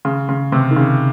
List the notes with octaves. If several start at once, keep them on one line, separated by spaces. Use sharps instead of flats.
C#3
C#3
C3
D#3
C#3